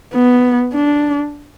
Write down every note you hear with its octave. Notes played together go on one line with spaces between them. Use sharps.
B3
D4